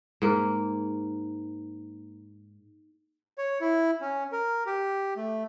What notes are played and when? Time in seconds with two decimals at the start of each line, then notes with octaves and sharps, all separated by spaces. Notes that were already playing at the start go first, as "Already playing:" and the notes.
0.22 G#2 A#3
3.38 C#5
3.61 E4
4.01 C#4
4.32 A#4
4.67 G4
5.17 A3